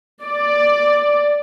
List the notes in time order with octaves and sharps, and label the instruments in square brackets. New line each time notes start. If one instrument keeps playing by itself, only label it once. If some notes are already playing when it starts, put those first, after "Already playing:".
[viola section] D5